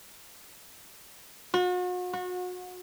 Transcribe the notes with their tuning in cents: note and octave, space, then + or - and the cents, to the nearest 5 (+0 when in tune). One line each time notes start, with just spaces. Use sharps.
F#4 -40
F#4 -30